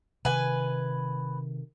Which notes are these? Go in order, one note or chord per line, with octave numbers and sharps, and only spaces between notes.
C3 D#3 B4 G#5